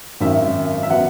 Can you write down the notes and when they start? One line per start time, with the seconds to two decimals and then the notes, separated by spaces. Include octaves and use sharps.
0.20 G#1 F#2 D#3 E5
0.83 E5
0.90 D#3 F#3 B3 F#5